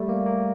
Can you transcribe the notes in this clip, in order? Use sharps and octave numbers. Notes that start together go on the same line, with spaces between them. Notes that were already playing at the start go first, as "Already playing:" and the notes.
Already playing: G3 A3
A#3
A#3